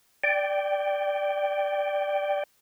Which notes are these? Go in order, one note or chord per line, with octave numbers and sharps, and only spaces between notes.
D5 G5